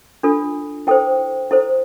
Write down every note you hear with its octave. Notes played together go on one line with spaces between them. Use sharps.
D4 F4 A4
E4 A4 C5 G5
E4 A4 C5